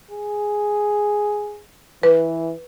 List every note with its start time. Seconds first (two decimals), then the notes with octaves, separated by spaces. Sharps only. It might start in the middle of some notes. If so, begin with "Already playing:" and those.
0.11 G#4
2.03 E3 B4